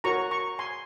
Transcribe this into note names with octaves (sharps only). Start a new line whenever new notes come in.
F#4 A#4 C#5 A#5 C#6
A#5 C#6
G#5 C6